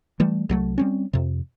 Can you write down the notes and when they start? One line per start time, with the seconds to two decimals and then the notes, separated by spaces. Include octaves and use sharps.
0.20 E3 G3 A3
0.49 C2 F#3 A3
0.78 G3 C4 C#4
1.13 F2 C3